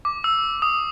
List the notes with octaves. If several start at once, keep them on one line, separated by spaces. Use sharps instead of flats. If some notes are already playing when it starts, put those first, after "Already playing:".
D6
E6
D#6